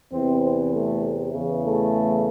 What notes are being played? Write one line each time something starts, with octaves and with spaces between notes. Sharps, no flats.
E2 C3 E3 C4
C4
A3
E2 C#3 E3
A3